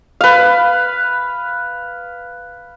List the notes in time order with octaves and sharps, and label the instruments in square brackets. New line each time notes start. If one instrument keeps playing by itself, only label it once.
[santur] B4 F5